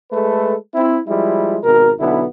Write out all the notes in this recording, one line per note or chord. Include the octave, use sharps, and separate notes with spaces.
G#3 A3 A4 B4
C4 E4
F3 G3 G#3 E4
G#1 B2 A#4
B1 D3 B3 E4